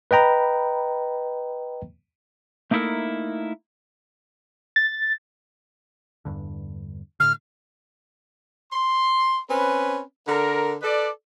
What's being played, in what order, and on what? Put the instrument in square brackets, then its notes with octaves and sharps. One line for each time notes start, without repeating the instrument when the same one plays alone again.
[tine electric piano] B4 D#5 G5 A#5 B5
[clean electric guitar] A3 A#3 D#4 E4 A4 A#4
[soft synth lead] A6
[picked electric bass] E2 G2 D3
[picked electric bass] A2 D3 [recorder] F6
[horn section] C6
C4 C#4 B4
D3 A#4
A4 B4 D5